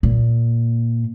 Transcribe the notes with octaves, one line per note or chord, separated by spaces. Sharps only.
A#2